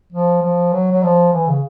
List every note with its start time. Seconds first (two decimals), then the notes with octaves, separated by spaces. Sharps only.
0.13 F3
0.42 F3
0.73 F#3
0.91 F#3
1.04 F3
1.33 E3
1.48 C#3